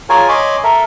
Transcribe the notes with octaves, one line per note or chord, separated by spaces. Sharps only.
F4 G#4 A#4 C#5 G#5
C#5 D#5 G#5 B5 C6 D6
A4 A#4 E5